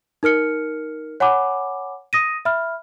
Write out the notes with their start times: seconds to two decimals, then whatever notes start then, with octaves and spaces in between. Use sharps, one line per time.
0.23 D#4 A#4 F6 C#7
1.20 C#5 F#5 G#5 B5 D6
2.13 D#6 A#6 D#7
2.45 E5 B5 F6